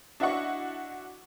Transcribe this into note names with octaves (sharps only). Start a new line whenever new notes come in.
D4 E4 F#4 D#5 F#5 C#6